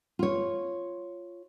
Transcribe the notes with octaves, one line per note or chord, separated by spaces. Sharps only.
F4 C#5